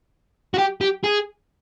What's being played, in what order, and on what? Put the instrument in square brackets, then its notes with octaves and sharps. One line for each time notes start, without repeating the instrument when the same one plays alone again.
[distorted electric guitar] F#4
G4
G4
G#4